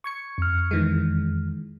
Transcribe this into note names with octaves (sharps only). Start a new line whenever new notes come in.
C#6 G#6 C#7
F2 F6
D#3 E3 G#3